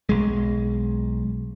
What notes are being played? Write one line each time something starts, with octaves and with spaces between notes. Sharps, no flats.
B1 G#3